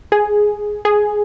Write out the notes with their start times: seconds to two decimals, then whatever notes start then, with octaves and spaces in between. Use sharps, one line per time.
0.12 G#4
0.85 G#4